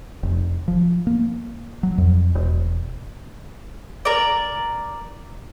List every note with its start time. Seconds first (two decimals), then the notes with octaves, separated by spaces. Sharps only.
0.23 F1
0.68 F3
1.07 A#3
1.83 F#3
1.98 F2
2.35 E1
4.05 A#4 D5